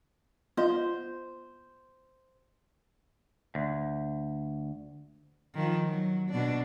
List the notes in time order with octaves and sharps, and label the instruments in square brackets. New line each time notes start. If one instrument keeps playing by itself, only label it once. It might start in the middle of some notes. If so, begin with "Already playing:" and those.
[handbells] B3 F4 D#5 [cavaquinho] C5
[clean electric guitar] D2
[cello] D#3 F3
F#3
B2 D4